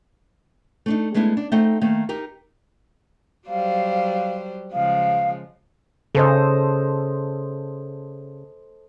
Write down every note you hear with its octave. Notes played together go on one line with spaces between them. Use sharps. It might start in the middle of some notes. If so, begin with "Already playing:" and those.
A3 D4 D#4
G#3 A3 B3 D4 E4
D4
A3 C4 D#4 A4 D#5 F#5
D#3 A3 A#3
D#4 G4 A#4
F#3 G3 C5 F5
C#3 F3 G#3 F5
C#3 A4 C5 D#5